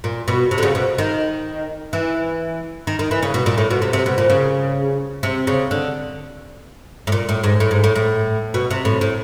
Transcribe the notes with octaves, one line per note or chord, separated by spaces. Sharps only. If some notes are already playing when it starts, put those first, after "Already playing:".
A#2
B2
C3
D3
C#3
B2
D#3
E3
D#3
D#3
E3
C#3
B2
A#2
A2
B2
C3
C3
B2
A#2
C#3
C3
C#3
D3
A2
A#2
A2
G#2
A2
G#2
A2
A2
B2
C3
A2
A2